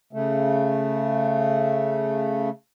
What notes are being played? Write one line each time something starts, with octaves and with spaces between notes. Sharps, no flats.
C#3 A3